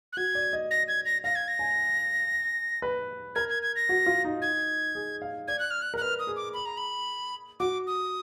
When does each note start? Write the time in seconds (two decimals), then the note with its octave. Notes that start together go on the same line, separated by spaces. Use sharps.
0.13 F#6
0.17 F#4 G#6
0.35 D5
0.53 D#5
0.71 A#6
0.88 G#6
1.06 A#6
1.24 F5 A#6
1.36 G#6
1.48 A#6
1.59 G#5
2.82 B4
3.35 A#4 G#6
3.49 G#6
3.63 G#6
3.76 A#6
3.89 F#4
4.06 F4
4.25 D#4
4.42 G#6
4.95 G#4
5.22 F5
5.48 D5 G#6
5.59 F#6
5.71 F6
5.82 F#6
5.94 A#4
5.97 F#6
6.01 B4 F6
6.19 D#6
6.27 G#4
6.36 D6
6.54 B5
6.66 A#5
6.77 B5
7.60 F#4 D6
7.87 D#6